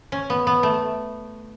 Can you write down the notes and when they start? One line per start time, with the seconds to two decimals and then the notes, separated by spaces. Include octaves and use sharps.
0.12 C#4
0.30 B3
0.47 B3
0.63 A3